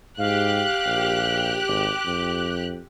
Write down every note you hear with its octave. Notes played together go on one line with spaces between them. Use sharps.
G#2 G4 F5 F#6
A#1
G#1 D6
F2